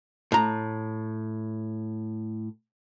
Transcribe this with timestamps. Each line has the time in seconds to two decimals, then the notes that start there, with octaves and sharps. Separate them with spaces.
0.32 A2 A#5